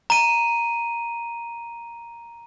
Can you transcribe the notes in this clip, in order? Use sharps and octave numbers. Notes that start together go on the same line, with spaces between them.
A#5 D#7